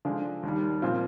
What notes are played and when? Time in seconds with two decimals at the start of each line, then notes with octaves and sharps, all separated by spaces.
0.05 D3 F3 G#3 D4 F4
0.43 D#2 D#3 G3
0.82 A#2 F3 C4 F4